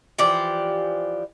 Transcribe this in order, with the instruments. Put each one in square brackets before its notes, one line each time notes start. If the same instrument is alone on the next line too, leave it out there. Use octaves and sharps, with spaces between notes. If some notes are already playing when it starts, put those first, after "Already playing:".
[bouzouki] E3 F3 G4 D5